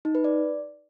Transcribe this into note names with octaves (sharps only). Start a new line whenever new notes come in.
D#4
B4
D5